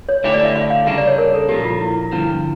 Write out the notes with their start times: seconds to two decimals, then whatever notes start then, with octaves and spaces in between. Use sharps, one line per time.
0.09 C#5
0.24 D3 A3 E4 G4 E5
0.34 D5
0.45 E5
0.56 E5
0.70 F5
0.86 C#3 G3 A#3 D4 E5
0.98 D5
1.07 C#5
1.18 A#4
1.34 A4
1.49 A#2 F3 A#3 G4
1.65 F4
1.81 E4
2.12 G2 D3 F3 E4